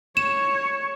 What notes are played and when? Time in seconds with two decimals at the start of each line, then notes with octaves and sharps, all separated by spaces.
0.17 C#5 E7